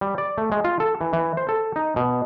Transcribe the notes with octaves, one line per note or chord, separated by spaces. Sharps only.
G3
D5
A3
G#3
F4
A4
E3
E3
C5
A4
D#4
B2